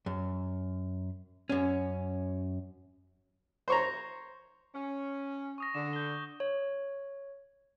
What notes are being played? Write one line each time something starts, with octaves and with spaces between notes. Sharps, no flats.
F#2
F#2 C#4
C5 C#5 A#5
C#4
C#6 D#6 A#6
D3 E7
G6 G7
C#5